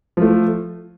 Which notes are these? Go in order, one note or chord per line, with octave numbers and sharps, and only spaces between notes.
F3 A3